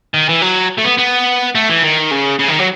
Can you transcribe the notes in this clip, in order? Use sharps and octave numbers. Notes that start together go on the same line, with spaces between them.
D#3
E3
F#3
A3
B3
B3
A3
E3
D#3
C#3
C#3
D#3
F#3